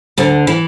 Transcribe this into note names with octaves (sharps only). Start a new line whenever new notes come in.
D2 D3
E3